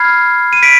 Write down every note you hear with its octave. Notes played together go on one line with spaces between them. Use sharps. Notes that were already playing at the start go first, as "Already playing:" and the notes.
Already playing: B5 F6 G#6 C7
D#7
B6 D7